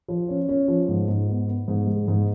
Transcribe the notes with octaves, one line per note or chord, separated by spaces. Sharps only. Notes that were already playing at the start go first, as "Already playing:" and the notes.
F3
C#4
C#4
F3
G#2
G#2
B3
B3
G#2
G#3
G#2